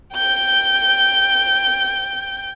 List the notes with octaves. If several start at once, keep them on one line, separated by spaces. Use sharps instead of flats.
G5 G6